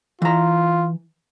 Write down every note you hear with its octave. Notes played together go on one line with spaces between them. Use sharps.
E3 F4 A#5